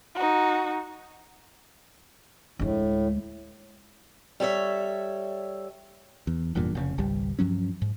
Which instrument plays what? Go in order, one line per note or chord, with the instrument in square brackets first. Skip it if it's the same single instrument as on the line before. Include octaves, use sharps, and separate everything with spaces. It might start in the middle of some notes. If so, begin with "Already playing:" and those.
[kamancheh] D#4 F#4
[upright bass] D2 G#3 [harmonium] A2
[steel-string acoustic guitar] G3 A4 C#5 E5
[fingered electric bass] E2
F1 E2 G2 A#2
F1 A#2 C#3
G#1 C#2 G3
G2 F3 F#3 C#4
G#2